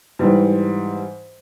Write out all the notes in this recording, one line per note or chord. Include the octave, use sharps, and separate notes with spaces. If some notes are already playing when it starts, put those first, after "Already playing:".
G#2 E3 G3